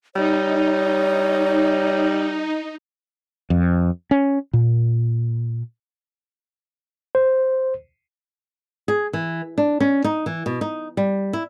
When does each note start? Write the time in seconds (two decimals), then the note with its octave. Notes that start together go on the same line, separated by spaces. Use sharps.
0.15 G3 D#4 C#5
3.50 F2
4.11 C#4
4.53 A#2
7.15 C5
8.88 G#4
9.13 E3
9.58 D4
9.80 C#4
10.04 D#4
10.26 E3
10.46 B2
10.61 D#4
10.97 G3
11.33 E4